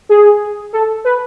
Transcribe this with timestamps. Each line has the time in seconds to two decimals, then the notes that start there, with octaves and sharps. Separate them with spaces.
0.09 G#4
0.73 A4
1.05 B4